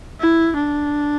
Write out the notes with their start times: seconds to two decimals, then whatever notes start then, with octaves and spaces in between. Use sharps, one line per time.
0.21 E4
0.56 D4